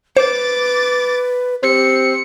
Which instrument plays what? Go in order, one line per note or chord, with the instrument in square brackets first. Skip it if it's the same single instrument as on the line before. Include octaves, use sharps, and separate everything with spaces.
[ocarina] B4 [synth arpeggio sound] C5 [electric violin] D6 A6
[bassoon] C4 [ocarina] G4 [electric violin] C#7